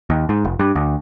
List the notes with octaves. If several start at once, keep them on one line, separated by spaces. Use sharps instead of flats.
D#2
G#2
F1
G2
D2